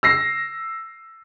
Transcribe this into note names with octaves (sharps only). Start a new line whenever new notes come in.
E6 A#6 C7